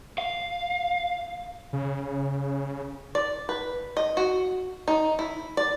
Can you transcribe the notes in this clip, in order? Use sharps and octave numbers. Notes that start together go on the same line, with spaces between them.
F5
C#3
D5
B4
D#5
F#4
D#4
E4
D5